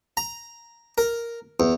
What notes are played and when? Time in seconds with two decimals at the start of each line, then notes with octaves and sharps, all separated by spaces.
0.17 A#5
0.98 A#4
1.60 E2